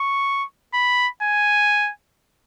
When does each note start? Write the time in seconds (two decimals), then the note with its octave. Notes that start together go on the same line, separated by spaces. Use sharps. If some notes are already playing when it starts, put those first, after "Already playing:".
Already playing: C#6
0.74 B5
1.22 G#5